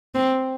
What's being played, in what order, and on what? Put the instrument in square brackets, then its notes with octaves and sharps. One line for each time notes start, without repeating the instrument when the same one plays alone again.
[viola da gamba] C4